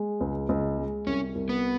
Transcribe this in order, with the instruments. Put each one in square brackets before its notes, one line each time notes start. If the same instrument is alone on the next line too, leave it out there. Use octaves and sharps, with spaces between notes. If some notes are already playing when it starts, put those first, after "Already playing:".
Already playing: [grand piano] G#3
C#2
C#2
G#3
[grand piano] C2 [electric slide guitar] C#4
[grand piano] C2
[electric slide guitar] B3